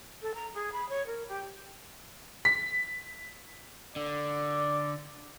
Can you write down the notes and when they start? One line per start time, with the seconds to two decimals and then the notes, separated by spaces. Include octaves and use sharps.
0.22 A4
0.34 A#5
0.54 G#4
0.72 B5
0.89 C#5
1.06 A#4
1.28 G4
2.45 B6
3.96 D3 D5